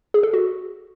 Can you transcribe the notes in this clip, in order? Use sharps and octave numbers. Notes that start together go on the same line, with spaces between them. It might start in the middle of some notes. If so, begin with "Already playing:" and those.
G#4
A4
F#4